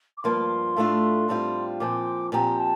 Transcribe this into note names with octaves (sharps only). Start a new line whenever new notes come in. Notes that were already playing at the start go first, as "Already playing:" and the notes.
D6
G2 F3 A#3 F4 C6
A2 A3 D4 F4
A2 G3 C4 F4
A#2 F3 C4 D6
A#2 F3 C4 G4 A#5
A5